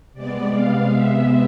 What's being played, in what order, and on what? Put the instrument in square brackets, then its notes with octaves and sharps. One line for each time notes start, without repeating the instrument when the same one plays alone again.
[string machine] C3 G#3 B3 D5
F5
E5